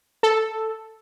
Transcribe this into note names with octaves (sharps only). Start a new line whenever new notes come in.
A4